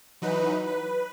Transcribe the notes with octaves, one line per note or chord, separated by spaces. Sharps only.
E3 F#3 D#4 B4
B4